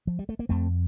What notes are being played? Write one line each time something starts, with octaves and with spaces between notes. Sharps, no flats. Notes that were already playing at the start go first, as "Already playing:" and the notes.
F3
G3
A3
A#3
F2 A3 C4